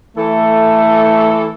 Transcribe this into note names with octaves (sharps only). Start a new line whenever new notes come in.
E3 A3 A4